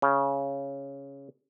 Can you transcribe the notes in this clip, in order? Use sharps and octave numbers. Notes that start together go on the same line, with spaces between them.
C#3